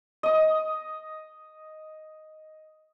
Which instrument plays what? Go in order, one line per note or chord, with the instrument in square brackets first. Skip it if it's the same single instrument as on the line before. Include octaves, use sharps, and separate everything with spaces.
[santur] D#5 D#6